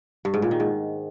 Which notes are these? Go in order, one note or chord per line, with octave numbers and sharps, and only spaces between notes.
G2
G#2
A#2
D#3
G#2